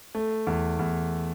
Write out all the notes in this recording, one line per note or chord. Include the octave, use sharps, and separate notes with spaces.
A3
E2
E2